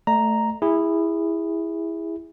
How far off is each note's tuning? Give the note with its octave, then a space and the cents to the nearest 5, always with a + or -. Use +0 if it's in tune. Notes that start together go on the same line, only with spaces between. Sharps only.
A3 +0 D5 +40 A#5 +0
E4 +0 G#4 -25